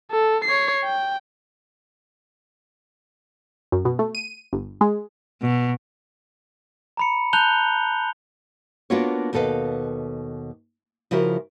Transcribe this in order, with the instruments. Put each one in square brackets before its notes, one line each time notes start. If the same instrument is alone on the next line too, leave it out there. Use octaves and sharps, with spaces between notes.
[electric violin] A4
C#5 C7
G5
[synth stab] F#2
B2
A3
D#7
G1
G#3
[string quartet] B2
[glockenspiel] A#5 B5 C#7
A5 A#5 F#6 G6 F7 G7
[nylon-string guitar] A#3 B3 D4 F4 F#4 C#5
D#2 B2 A4 B4 F5
C#3 F3 E4 F#4 A#4